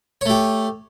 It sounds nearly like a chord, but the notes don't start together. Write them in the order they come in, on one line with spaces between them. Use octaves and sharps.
C#5 A3 G4